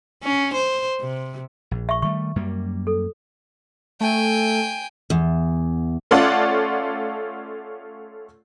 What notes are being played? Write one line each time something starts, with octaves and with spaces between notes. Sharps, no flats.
C#4
C5
C3
A#1
E5 C#6
D#3 G3 A3 C#6
F#2 G3 A#3
A4
A3 G5 G#5
E2
A3 C#4 F4 A4 D5 F#5